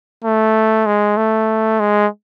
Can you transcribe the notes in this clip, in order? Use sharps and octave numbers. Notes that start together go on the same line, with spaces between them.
A3
G#3
A3
G#3